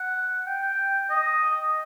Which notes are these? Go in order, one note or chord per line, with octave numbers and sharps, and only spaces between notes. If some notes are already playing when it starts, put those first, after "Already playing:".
Already playing: F#5
G5
D#5